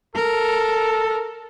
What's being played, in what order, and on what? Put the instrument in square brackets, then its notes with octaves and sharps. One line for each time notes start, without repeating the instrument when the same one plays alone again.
[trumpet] A4 [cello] A#4